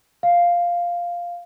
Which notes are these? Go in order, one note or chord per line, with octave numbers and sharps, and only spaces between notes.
F5